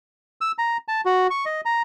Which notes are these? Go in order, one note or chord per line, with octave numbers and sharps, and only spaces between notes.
E6
A#5
A5
F#4
C#6
D#5
A#5